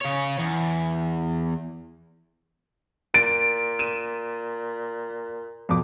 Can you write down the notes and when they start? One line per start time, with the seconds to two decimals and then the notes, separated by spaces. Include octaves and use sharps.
0.02 C#3 C#5
0.39 E2
3.14 A#2 A6 D7
3.79 D#7 E7
5.69 F2 B2 D6